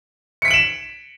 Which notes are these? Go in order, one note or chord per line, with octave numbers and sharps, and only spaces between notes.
B6 C#7 D7 E7 F#7